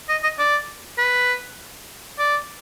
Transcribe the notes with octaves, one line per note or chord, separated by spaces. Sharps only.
D#5
D#5
D5
B4
D5